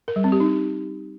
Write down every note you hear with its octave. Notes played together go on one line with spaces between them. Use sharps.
A#4
G3
C4
G4
D#4